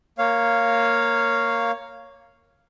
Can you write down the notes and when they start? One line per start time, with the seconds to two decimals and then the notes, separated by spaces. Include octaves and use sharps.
0.18 A#3 C#5 F5